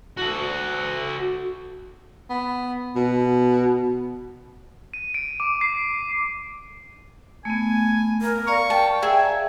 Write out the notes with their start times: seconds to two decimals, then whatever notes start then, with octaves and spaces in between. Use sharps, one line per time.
0.17 F#4 A4
2.30 B3
2.96 B2
4.94 D#7
5.14 D7
5.40 D6
5.61 C7
7.45 A3 B3 G#5
8.22 A#4
8.47 D5 F5 A#5 C#6
8.70 G5 A5
9.02 G#4 E5 G#5